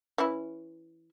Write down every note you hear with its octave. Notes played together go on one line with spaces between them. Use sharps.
E3 C#4 E4